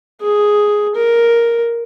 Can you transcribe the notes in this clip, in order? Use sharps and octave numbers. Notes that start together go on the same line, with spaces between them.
G#4
A#4